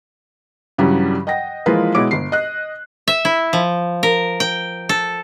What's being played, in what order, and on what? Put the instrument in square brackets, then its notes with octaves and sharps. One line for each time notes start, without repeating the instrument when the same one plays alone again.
[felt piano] G2 C#3 E3 F#3 G3
D#5 F#5 G5 A#6
E3 F3 G#3 A#3 F4 B4
B2 G#3 E4 C#5 D6 D7
G1 C7
D#5 F#6
[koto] E5
E4
F3
A#4
G5
A4